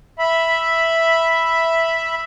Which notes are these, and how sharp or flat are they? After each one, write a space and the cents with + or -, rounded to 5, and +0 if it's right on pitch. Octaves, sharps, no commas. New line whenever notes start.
E5 +0 B5 -5